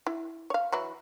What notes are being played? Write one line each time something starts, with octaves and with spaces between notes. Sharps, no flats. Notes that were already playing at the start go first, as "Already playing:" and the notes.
E4
C#5 F5
E3 F#3 E4